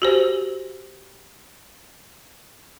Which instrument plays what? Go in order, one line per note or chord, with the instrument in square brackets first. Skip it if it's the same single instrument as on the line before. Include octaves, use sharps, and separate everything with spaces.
[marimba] F#4 G4 C5